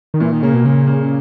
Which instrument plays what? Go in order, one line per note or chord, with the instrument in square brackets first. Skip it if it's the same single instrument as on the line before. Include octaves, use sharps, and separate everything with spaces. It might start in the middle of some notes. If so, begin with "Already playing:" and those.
[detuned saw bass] D#3
[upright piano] A#2 [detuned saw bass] E3
[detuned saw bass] D#3
[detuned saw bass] C#3 [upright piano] A#3
[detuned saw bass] B2
[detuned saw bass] C#3 [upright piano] A#3
[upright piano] A#3